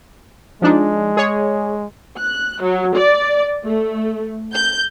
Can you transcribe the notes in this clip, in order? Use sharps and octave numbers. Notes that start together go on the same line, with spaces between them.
F3 G#3 D4 D#4
G#4 C#5
F#6
F#3
D5
A3
G6